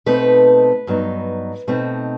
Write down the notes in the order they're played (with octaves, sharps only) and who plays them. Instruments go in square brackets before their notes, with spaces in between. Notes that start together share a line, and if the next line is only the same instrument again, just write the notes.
[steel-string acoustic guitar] B2 A3 C4 D#4 B4
G2 F#3 B3 D#4
B2 A3 C4 D#4